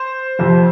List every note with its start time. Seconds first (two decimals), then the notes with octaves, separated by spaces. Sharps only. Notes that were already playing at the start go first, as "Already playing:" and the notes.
Already playing: C5
0.39 F2 C3 F3